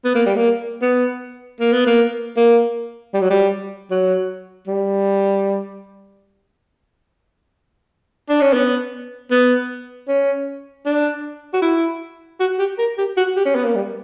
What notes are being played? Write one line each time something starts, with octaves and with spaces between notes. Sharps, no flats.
B3
A#3
G3
A#3
B3
A#3
B3
A#3
A#3
G3
F#3
G3
F#3
G3
D4
C#4
B3
B3
C#4
D4
F#4
E4
F#4
G4
A#4
G4
F#4
G4
C#4
B3
A#3
G3